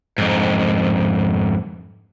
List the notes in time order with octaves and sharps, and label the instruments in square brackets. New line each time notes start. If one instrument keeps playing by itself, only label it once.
[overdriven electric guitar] F2 G#2